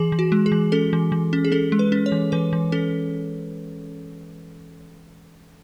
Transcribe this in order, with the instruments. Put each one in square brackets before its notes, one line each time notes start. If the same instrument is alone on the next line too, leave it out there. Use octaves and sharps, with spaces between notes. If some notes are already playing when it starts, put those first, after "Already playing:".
Already playing: [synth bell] E3 G#4
E3
F#4
G#3
G#4
E3
C#4 A4
E3
E3
C#4
G#4
C#4 A4
G#3
B4
C#4
C#5
E3
E3 B4
E3
C#4 A4